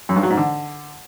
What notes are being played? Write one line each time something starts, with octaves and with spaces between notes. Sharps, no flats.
F#2
G2
F#3
G#2
D3